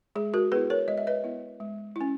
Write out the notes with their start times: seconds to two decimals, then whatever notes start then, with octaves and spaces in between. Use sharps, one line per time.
0.15 G#3 G#4
0.34 F#4 A#4
0.52 B3 E4 G#4 B4
0.70 A#4 C#5
0.88 G#3 D#5
0.98 E5
1.07 B4 D#5
1.24 B3 E4
1.60 G#3
1.96 C#4 E4